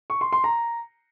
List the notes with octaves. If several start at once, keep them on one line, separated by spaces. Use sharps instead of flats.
C#6
C6
C6
A#5